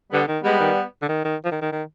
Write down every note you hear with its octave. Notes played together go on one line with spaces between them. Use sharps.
D3 G3 B3
D#3
G3 G#3 B3
D#3
D3
D#3
D#3
F3
D#3
D#3
D#3